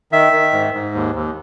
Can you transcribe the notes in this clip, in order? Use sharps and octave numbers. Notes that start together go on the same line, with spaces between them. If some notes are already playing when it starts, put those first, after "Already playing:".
D#3 E5
D#3
G#2
G#2
D#2
D#2